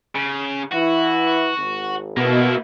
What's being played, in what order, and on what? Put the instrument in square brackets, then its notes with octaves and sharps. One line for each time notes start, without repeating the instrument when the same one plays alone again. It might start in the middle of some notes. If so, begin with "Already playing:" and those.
[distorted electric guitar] C#3
[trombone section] E3 E4 [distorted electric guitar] F#4
[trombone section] G#1
[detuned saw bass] B2 [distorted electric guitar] A#3 E4